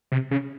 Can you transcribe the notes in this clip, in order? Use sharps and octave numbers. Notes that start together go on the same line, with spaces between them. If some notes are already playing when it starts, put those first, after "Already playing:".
C3
C#3